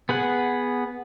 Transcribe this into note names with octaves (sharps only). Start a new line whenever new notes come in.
B3 G#4 F#5